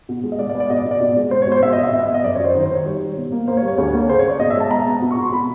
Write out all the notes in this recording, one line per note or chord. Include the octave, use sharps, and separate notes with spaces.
B2
G#3
D#5
G#3 D5
D5
B3
D5
B2 D#5
D5
B2
D5
B2
G#3
G#3 C5
C#5
B2 C5
B2 E5
D#5
B2
E5
B3 E5
E5
B3
D#5
F#2 D5
C#5
F#3 C5
D#3 C5
C5
D#3
C#5
G3
G3
B2
A#3
A#3 C5
C#5
G3
C#5
D2 C#5
A#3
C#3 C5
C#5
C#3 D5
B2 D#5
E5
G#3 A5
B3 A#5
B3
B2
C#6
B2 C6
B2 B5